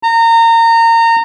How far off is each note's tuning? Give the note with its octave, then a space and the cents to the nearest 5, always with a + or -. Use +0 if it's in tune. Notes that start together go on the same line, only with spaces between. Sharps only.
A#5 -25